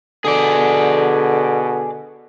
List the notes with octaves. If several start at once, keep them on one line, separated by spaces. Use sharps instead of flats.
B2 D3 G#4 D5